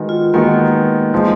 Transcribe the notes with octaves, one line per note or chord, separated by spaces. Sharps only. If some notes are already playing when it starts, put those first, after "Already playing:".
Already playing: D#3 G#3 B3 F#4
F4
D#3 G#3 A#3 B3 F#4
F3 G#3